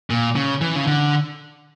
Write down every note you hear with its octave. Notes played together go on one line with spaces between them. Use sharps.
A#2
C#3
E3
C#3
D3